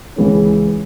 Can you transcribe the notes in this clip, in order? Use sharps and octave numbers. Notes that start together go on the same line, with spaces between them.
C#2 C#3 E3 G#3 C#4